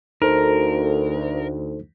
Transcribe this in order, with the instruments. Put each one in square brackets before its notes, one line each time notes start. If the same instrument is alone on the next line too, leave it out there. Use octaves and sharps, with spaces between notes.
[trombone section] D2 [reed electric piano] D#4 A4 C5 [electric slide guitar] A#4